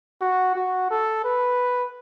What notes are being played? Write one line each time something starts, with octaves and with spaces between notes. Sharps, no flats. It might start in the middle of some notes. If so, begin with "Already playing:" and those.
F#4
F#4
A4
B4